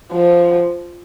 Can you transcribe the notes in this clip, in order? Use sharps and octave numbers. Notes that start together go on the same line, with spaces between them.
F3